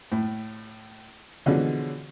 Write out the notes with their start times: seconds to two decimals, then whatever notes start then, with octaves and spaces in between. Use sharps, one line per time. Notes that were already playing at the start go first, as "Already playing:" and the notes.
0.12 A2
1.46 B2 D3 E3 F3 G#3 C#4